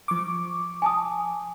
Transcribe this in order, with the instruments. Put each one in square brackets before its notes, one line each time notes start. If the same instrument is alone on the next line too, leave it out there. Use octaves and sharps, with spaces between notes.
[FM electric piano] F3 C#6 D6
[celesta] G#5 A5 D#6